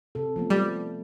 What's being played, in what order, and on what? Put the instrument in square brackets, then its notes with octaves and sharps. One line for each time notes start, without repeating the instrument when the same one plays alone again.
[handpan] C3 A4
F3 A3 B3
[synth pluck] G3